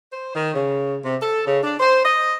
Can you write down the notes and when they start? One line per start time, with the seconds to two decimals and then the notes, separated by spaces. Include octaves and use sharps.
0.13 C5
0.35 D#3
0.54 C#3
1.05 C3
1.22 A4
1.47 C#3
1.63 D4
1.80 C5
2.04 D#5